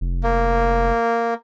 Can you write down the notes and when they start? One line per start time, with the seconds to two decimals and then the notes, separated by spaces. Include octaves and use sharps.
0.01 F1
0.23 A#3